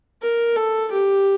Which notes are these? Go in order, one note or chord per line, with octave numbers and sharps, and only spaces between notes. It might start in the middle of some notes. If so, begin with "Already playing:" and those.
A#4
A4
G4